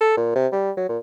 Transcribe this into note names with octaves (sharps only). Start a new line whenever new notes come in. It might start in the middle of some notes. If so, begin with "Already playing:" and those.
A4
A#2
C3
G3
F#3
A#2